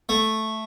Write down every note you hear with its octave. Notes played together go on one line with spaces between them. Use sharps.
A3